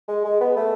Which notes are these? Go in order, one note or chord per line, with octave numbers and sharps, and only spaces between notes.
G#3
G#3
B3
A3